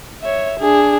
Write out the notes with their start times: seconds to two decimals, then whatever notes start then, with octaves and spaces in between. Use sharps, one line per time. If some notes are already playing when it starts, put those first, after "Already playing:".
0.22 C#5 E5
0.60 D4 G#4